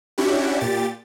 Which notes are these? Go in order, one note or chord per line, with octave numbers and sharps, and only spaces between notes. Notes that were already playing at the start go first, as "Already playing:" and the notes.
C#4 D4 E4 F#4 G4
A#2 G4 A6